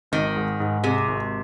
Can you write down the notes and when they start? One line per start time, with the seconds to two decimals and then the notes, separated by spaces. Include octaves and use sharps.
0.12 G#1 D#3
0.36 G#2
0.60 G#2
0.84 C3 G#3
1.08 G#1